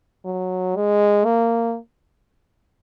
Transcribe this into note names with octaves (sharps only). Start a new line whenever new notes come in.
F#3
G#3
A#3